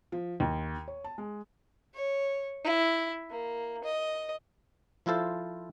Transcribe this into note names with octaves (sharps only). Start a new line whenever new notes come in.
F3
D#2
C#5
A5
G#3
C#5
E4
A#3
D#5
F3 E4 F4 A4 C5